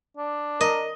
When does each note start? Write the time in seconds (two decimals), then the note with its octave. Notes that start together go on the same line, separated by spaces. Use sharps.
0.17 D4
0.61 A#4 D#5